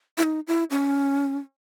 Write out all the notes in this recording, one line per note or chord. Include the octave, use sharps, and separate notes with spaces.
E4
D#4
E4
C#4